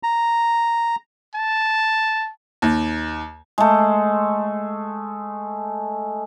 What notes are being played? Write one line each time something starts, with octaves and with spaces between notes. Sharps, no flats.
A#5
A5
D#2
G#3 A3